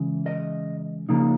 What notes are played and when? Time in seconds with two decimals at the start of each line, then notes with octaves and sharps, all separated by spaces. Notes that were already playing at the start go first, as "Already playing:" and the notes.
Already playing: C#2 C#3 E3
0.26 D#5
1.09 C#3 F3 A#3 D#4